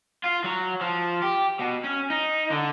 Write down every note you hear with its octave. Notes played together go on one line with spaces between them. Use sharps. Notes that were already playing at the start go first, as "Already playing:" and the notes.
F4
F#3
F3
G4
B2
C#4
D#4
D3